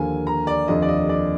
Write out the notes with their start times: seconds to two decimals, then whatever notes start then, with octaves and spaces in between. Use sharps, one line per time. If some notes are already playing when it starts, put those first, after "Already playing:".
Already playing: D#2 D3 F3 A#3 G#5
0.27 A#5
0.47 D5
0.68 F1 D#2 D3 F3 D#5
0.82 D5
0.89 D#5
1.09 D5